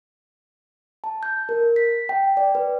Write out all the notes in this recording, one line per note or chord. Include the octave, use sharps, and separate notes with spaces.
A5
G6
A#4
B6
G5
D5
B4